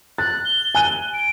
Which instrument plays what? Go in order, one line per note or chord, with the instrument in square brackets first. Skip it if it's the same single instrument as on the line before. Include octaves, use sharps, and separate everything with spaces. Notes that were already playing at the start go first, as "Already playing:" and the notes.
[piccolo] F#6 [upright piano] A6
[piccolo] G7
[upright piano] G#5 F#6 D#7
[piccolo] D7